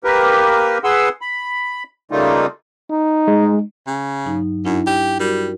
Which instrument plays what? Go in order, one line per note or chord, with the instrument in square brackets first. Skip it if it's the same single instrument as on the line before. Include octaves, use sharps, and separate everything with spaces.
[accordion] A#3 G4 A#4 B4
G#4 B4 F#5 C6 E6
B5
C#3 G3 A3 A#3 D#4 F4
[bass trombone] D#4
[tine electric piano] G#3
[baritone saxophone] C#3
[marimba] G2 F#3 D#4
[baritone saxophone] F#2 [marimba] D4 E4
[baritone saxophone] G4
[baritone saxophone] G3 [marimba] F#4 A#4